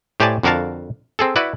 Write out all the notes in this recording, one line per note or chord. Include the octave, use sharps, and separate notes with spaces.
A2 G4 C5 D5 G#5 A5
F2 D3 F#4 A#4 F5 A5
C4 G#4 A4
E4 F#4 B4 D5